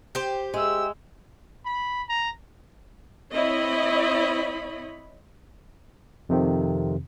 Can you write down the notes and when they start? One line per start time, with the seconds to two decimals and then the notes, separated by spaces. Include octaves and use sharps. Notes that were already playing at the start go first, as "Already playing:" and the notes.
0.15 G4 C5
0.54 G#3 G#4 E5 E6
1.65 B5
2.09 A#5
3.33 C4 E4 C#5 D#5 B5
6.29 F2 C3 D#3 C4